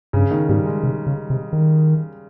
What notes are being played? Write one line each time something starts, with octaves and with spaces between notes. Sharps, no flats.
G2 C#3
D#3
G#2 G3
G#3
C3
C#3
C3
D#3